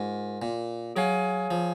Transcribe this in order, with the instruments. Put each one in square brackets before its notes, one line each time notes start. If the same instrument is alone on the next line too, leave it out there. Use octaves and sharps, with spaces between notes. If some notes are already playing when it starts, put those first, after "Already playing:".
Already playing: [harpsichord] G#2 [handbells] F4 A#4
[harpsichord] A#2
[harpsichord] F#3 [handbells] G#4 C#5 F5 G#5
[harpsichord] F3